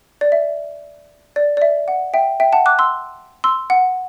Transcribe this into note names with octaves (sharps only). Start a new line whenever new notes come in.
D5
E5
D5
D5
E5
F#5
E5 G5
E5 G5
F#5 A5
D6 F#6
C6 E6
C6 E6
F#5